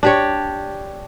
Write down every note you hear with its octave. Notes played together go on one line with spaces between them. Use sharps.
D4 G4 C#5